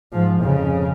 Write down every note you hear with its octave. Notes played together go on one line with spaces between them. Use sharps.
G#2 F3
F2 C#3